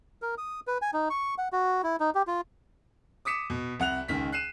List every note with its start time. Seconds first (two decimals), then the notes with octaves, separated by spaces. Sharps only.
0.22 A#4
0.38 D#6
0.67 B4
0.82 G#5
0.94 D#4
1.10 C#6
1.38 F#5
1.52 F#4
1.83 E4
2.00 D#4
2.15 G4
2.27 F4
3.25 D6 D#6 B6 C#7 E7
3.50 B2
3.80 C2 F#5 F#6 F7
4.08 C#2 D#3 B6
4.32 F#6 C7 D#7 E7